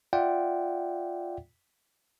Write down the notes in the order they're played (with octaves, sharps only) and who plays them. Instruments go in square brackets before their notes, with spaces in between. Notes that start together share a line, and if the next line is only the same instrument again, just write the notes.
[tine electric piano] F4 D5 E5 F#5 G5